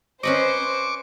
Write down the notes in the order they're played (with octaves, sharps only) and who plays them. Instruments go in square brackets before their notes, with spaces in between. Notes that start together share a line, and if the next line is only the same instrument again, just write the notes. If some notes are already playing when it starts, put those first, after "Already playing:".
[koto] C#4 B4 D#5 [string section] C5 [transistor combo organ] C#6 D6